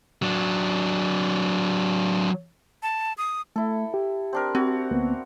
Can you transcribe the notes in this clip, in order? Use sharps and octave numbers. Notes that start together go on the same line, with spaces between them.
F#3 D4
A5
D#6
A3 E4 A4
G4
C4 D4 A#4
C4 F#4
D2 A#3 B3